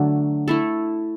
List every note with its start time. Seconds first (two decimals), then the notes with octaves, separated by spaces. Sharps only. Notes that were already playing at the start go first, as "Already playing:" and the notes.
Already playing: D3 F#3 A3 D4
0.48 A3 E4 A4